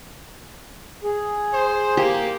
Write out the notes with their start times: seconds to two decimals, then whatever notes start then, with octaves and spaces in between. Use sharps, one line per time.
1.04 G#4
1.53 C5
1.97 A#3 G4